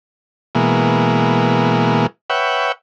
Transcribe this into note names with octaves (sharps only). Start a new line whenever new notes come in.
B2 E3 G#3 A#3
B4 C#5 E5 F#5 G5